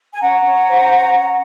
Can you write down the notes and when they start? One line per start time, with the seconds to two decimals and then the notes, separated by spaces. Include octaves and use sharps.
0.12 G#5
0.20 C#4 F#5 A#5
0.44 C#4
0.67 C5
0.91 C#4
1.14 C#4